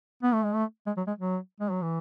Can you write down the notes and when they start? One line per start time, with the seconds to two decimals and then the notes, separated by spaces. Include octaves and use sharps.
0.23 B3
0.34 A3
0.44 G#3
0.54 A3
0.86 G#3
0.97 F#3
1.07 G#3
1.19 F#3
1.60 G#3
1.71 F#3
1.82 E3